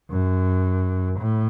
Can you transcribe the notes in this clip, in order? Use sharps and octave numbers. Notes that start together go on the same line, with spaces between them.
F#2
A2